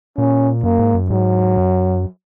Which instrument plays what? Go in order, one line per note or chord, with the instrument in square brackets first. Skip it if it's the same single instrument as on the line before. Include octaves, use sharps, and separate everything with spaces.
[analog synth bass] A#2 [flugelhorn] C#4
[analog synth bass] F#2 [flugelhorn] A#3
[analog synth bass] G#2
F#2
[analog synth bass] G#2 [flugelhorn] F#3
[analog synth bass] F#2